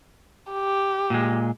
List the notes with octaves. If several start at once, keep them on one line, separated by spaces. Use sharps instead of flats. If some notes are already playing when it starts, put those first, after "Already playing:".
G4
A#2 G#3